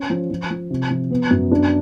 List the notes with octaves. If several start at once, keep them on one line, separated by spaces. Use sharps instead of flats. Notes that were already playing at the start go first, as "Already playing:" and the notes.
Already playing: C#4
F3
F3
F3
C3
F3
B3
F#2
D4